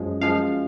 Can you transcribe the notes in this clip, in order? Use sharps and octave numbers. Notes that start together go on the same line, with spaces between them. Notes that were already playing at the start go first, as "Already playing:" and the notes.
Already playing: F#2 F3 G#3
F#2 F3 G#3 F5